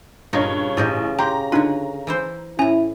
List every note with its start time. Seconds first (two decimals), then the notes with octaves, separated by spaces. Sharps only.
0.33 G2 A#2 C#3 D#4 F4 C#5
0.77 A1 D#4 G4 G#4
1.19 G4 G5 A#5 C6
1.52 D3 D4 D#4 F4 B4
2.07 E3 E4 C5
2.59 A2 C#4 E4 G#5 A#5